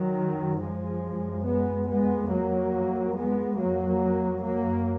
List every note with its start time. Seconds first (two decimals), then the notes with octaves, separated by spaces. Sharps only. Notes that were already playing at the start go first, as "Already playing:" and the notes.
Already playing: D#3 F#3
0.19 F#2
0.61 F3 G#3
1.04 F#2
1.46 G#3 B3
1.88 F2 G#3 B3
2.31 F#3 A#3
2.74 F2
3.16 G#3 B3
3.59 F2 F#3 A#3
4.44 F#2 F#3 A#3